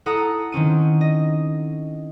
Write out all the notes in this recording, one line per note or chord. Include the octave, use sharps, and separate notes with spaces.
E4 A4 F#5 A#5 D#6
D#3 C4 C#4 D#7
D#5